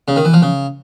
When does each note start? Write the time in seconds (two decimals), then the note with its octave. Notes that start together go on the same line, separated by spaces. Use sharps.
0.08 C#3
0.16 D#3
0.25 E3
0.34 F3
0.42 C#3